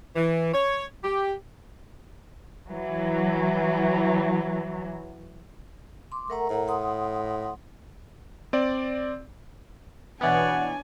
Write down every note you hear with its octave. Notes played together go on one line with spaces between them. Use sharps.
E3
C#5
G4
E3 F#3
C6 D6
A3 A#4 F#5 A#5
A2
F#5 C6 D#6
C4 D5
B2 E3 B3 D4 C#5 D5 F#5 G#5